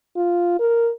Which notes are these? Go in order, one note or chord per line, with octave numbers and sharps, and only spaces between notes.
F4
A#4